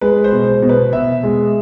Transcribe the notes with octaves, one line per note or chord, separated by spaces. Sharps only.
G#3 B4
C5
B2
C5
B2
B4
B2 E5
G#3